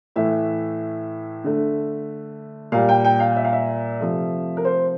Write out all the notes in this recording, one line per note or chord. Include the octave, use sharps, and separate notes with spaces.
A2 E3 A3 E5
D3 A3
A#2 G3 F5
G5
G5
F5
E5
F5
E5
C3 F3 A3
A#4
C5